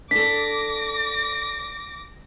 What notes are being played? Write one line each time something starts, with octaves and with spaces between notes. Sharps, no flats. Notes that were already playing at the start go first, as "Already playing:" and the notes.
D4 A4 D6 A#6 B6